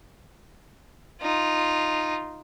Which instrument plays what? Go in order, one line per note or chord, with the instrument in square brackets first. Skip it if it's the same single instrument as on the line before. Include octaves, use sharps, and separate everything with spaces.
[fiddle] D#4 F4